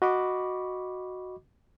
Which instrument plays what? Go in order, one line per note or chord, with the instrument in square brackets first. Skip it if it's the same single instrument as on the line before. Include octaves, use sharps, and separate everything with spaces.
[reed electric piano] F#4 D#5 B5 C#6 D6